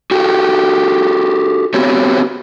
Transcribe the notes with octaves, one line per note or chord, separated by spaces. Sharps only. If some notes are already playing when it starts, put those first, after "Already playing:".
F#4 G4 A4
B3 C4 F#4 G4 C#5